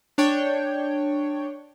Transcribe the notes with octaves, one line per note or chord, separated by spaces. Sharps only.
D4 C#5 G5